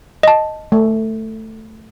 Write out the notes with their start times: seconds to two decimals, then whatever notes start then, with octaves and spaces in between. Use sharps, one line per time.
0.23 D#5 A5
0.72 A3